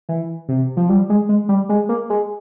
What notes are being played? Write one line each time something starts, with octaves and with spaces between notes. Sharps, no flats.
E3
C3
F3
G3
G#3
G#3
G3
G#3
A#3
G#3